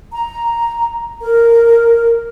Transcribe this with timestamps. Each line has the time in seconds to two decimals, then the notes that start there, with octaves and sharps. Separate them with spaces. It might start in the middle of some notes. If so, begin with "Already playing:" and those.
0.13 A#5
1.22 A#4